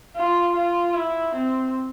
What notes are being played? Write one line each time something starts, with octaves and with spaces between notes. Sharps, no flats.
F4
F4
E4
C4